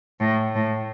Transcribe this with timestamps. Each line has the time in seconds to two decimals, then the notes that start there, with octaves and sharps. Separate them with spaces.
0.20 A2
0.55 A2